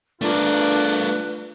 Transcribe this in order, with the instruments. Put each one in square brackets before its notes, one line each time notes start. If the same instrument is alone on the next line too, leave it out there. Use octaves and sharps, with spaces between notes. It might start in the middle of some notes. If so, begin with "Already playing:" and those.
[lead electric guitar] A3 A#4 [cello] D4 [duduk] F4 [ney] B4